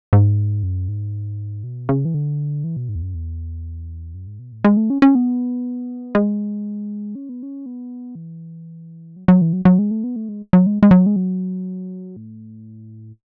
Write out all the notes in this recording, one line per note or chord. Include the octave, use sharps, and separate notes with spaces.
G#2
F#2
G#2
B2
C#3
E3
D3
E3
B2
G#2
E2
F#2
E2
F#2
G#2
B2
A2
G#3
A3
C#4
C#4
B3
G#3
C#4
B3
C#4
B3
E3
F#3
F#3
E3
F#3
F#3
G#3
A3
B3
A3
G#3
F#3
G#3
G#3
F#3
G#3
F#3
A2